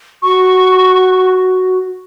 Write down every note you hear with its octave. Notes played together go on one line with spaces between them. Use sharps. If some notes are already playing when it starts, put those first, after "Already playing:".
F#4 C#6